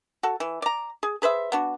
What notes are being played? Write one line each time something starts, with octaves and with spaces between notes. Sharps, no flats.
F#4 A4
E3
D5 A#5
G#4
G#4 B4 C5 E5
B3 D4 F#4